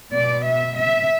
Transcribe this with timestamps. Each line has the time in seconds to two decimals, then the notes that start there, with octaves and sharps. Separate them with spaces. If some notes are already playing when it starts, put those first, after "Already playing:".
0.13 B2 B3 D5
0.44 E5
0.77 E5